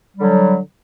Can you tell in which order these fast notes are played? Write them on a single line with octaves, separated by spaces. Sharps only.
G3 D3 F#3